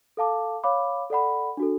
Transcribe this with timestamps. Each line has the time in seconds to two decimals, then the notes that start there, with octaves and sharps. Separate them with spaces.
0.17 A4 F5 A5 D6
0.64 C#5 F5 B5 D6
1.10 A4 D5 F#5 B5
1.57 D4 F#4 A4